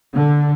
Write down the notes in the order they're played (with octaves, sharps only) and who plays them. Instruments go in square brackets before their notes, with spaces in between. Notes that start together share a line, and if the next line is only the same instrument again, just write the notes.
[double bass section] D3